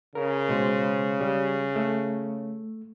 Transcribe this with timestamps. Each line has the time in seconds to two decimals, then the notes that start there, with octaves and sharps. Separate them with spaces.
0.15 C#3 A#4
0.49 B2 G#3 C5
1.21 G3
1.76 A3